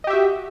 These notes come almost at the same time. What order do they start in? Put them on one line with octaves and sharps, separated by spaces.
D#5 G4 E5 F#4